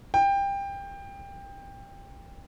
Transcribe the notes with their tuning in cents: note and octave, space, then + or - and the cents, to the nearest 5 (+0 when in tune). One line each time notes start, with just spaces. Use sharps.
G5 +20